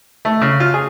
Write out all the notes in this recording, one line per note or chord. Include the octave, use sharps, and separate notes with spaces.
A3
C#3
F4
G#4